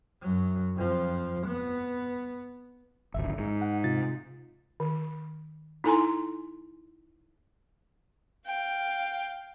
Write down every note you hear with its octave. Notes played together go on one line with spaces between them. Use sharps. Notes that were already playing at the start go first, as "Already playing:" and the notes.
F#2 F#3
F2 F3
B3
D1 G#1 E5
G#2
F#5
C3 F4 A6
D#3
D#4 E4 A4 G#5 A#5 C6
F5 G5